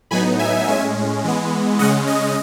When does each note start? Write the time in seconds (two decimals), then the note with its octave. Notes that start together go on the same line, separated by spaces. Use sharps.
0.11 A2 F#3 B3 D#4 G#5 B5
0.39 E5 G#5
0.68 A2 G#3 C#4
1.24 E3 G#3 B3
1.79 C#3 G#3 C#4 D#5 F#5
2.07 D#5